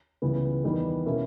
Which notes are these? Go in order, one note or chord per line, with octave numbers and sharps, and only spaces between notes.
C#2 C#3 E3 G3 B3
E2 D#3 G3 B3 D#4
B2 A#3 C#4 E4